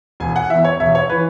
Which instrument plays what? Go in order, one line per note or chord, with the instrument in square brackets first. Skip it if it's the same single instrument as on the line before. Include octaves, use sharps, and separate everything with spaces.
[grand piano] E1 G#5
F#5
E2 E3 E5
C#5
E1 E5
C#5
E3 B4